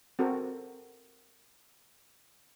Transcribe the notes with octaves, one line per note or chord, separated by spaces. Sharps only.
C4 F#4 A4 A#4